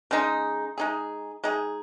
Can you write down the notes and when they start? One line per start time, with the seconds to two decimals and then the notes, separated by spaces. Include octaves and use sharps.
0.11 C#3 G#3 D#4
0.78 G#3 D#4 G#4
1.44 G#3 D#4 G#4